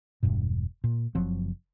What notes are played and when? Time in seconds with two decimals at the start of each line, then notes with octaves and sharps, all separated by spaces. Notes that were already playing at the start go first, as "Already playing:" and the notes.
0.23 E1 G2 B2
0.84 A#2
1.15 F#1 F3 F#3 C4